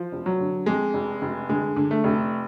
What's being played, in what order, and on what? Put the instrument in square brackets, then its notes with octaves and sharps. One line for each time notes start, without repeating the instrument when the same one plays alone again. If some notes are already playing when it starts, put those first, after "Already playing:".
Already playing: [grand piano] F3
[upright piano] F1
[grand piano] F#3
[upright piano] D3
[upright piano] F2 [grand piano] G#3
[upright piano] F1
F1
[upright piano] D3 [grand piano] G#3
[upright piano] D3
[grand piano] A3
[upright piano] F1